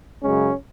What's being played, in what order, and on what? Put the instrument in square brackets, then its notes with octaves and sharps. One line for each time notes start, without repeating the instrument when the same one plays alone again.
[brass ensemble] F#2 C#3 G#3 C#4